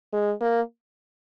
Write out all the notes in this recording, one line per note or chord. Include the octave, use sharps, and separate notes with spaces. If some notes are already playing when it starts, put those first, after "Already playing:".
G#3
A#3